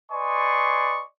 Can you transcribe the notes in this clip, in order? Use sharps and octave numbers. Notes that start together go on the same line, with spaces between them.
B4 D5 D#5 G#5 C6 C#6